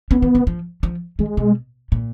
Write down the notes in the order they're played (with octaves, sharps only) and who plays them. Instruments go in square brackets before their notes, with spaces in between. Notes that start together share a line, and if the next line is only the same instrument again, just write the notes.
[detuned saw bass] B3 [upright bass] C#4
[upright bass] D#3
C#3
F3
F3
[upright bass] D#3 [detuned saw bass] G#3
[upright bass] B2
A#2